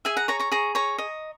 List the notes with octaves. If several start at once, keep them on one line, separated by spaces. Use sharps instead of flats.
G#4 E5 G#5
F#5 A#5
C#5 A#5 C#6
A#5 C#6
G#4 A#5 C#6
C#5 A#5 C#6
D#5